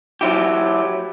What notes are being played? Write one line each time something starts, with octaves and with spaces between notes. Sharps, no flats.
F#3 E4 G4